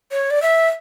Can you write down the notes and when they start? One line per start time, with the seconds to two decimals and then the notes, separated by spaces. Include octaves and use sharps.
0.11 C#5
0.30 D5
0.42 E5